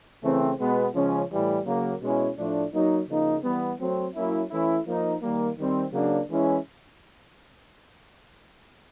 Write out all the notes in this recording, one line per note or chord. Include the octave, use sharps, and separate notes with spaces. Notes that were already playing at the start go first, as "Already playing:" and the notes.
C#3 E3 A3 C4
B2 G#3 B3
C#3 F3 G#3 C#4
A2 E3 G3
C#3 F#3 A#3
B2 G#3 C#4 E4
A2 F3 A3 D4
F#3 A#3 D#4
C#3 F3 A#3 D#4
E3 G3 B3
F#3 A3 C4
F#3 A#3 C#4 E4
E3 A3 C#4 E4
F3 A#3 D#4
D#3 G3 A#3
D#3 G3 C4
C#3 F#3 A#3 D4
E3 G#3 C#4 E4